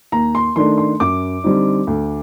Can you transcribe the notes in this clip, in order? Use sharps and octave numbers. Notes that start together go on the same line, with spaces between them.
D#2 A#5
C6
D#3 A3 D4 C6
C6
F#2 D6
D3 G3 C4 D#4
D2